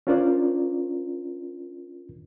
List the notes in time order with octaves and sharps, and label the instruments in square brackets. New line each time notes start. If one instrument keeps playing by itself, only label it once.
[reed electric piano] C#4 D4 F4 A#4 C5 D5